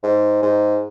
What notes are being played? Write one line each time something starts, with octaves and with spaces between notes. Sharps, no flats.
G#2
G#2